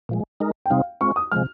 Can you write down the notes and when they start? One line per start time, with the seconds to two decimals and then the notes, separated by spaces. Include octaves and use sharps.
0.09 A#2 F3 G#3
0.40 G#3 D#4 A#4
0.66 G5
0.70 C3 G3 C4 D#4 F5
1.01 G#3 C4 F4 C#6
1.16 D#6
1.32 C3 F3 G#3 F6